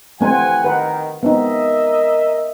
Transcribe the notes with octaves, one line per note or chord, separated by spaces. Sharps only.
E3 A3 C4 C5 F#5 G#5
D#3 B4 F#5
B3 C4 D#4 A#4 D#5 E5